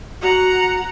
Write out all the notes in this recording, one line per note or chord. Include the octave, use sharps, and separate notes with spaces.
F#4 F#5 A#5